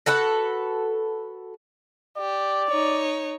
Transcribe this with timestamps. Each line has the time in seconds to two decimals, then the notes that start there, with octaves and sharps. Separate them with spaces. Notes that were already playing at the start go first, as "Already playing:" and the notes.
0.06 F#4 A4 B4 F#5
2.18 G4 D5
2.68 D#4 C#5